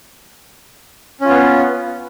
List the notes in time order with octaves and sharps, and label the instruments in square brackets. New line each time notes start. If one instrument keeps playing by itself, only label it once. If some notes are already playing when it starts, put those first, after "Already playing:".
[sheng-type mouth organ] C#4
F4
B3